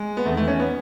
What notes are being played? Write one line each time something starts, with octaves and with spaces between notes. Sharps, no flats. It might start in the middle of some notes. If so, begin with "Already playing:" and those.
Already playing: G#3
B3
E2 D#3 A3
A3
C#4
B3